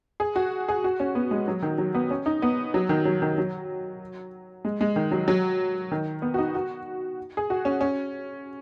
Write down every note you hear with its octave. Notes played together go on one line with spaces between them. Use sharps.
G#4
F#4
G#4
F#4
C#4
B3
G#3
F#3
D#3
F#3
B3
C#4
D#4
B3
F#3
D#3
F#3
D#3
F#3
G#3
G#3
D#3
F#3
F#3
D#3
B3
F#4
D#4
F#4
G#4
F#4
C#4
C#4